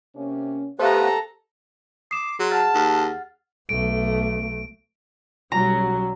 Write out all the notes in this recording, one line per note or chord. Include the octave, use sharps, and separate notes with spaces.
C3 A#3 C#4
A3 B3 G4 A4 B4 C5 F5 A#5
D6 D#6 C7 E7
F#3 G#4 C6
F#5 A5 F6 A6
D#2
B1 A3 D7
B1 F#3 G3 C#4 A#5